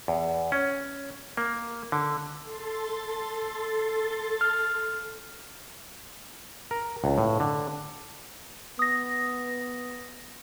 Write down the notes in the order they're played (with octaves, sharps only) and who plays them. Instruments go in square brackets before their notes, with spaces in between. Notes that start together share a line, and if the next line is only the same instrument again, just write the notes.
[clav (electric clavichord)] E2
C#4
A#3
D3
[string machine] A4 C6 A6
[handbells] F6
[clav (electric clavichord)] A#4
C#2
A2
D3
[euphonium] B3 [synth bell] D#6 A#6